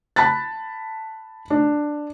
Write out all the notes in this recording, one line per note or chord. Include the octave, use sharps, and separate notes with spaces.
A5 B5 F#6 A6
D4